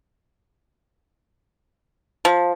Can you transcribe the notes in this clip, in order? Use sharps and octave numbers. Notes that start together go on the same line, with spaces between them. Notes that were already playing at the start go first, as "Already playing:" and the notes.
F3